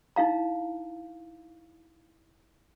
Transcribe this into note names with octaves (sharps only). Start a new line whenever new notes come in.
D#4 E4 F5 A#5